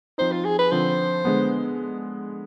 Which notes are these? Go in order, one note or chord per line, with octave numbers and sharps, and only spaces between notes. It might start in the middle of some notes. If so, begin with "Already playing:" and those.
F3 C4 D#4 C5
F4
G#4
B4
D3 F3 C4 C5
D3 G#3 B3